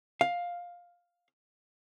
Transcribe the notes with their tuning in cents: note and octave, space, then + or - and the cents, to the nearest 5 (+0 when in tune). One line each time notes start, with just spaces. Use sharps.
F5 +10